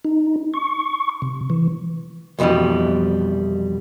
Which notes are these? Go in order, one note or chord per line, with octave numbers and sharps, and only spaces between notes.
D#4
C#6
C3
E3
C2 F2 B2 E3 G3